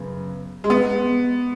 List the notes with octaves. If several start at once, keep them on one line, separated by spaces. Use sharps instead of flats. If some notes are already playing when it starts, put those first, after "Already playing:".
Already playing: F#2 C#3 B3
G#3
B3